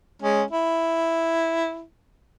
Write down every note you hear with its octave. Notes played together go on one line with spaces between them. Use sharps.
G#3 C#4
E4